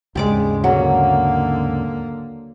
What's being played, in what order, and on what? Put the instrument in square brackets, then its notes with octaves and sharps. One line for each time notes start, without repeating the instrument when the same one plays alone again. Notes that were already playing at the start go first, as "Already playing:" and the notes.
[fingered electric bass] D#2 G#2 C#3 [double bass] G#3 [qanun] G4 D5 D6
[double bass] D3 A#3 [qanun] F#3